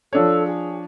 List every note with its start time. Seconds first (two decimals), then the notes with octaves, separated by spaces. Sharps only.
0.13 F3 D4 A4 C#5
0.47 G#4